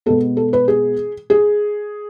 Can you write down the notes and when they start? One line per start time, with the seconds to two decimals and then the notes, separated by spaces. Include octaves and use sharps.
0.06 B2 G#3 B3 A4
0.37 A4
0.53 B4
0.68 G#4
1.30 G#4